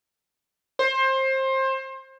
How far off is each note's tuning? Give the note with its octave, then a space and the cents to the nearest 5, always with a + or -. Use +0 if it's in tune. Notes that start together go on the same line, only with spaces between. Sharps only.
C5 +25